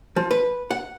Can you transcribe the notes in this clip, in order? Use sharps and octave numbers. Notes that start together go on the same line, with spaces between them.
F3
B4
F#5